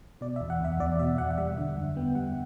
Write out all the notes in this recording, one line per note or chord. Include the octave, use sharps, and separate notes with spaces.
B2 D5
E5
E2
F#5
E2 E5
E2 D5
B2 E5
E2 F#5
F#5
G3 E5
D3 E5
F#2 F#5
B3 G5
G3 F#5